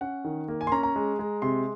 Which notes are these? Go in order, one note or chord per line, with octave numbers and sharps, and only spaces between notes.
C#4 F#5
D#3
A#3
G#5
C6
C#4 A#5
A#5
G#3
G#3
C3 C6